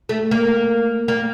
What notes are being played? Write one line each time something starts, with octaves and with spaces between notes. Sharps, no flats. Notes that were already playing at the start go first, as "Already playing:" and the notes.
A3
A#3
A#3